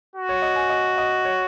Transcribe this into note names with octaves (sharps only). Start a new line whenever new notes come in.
F#4
C#5
D#5
G#5
D#5
D#5
C#5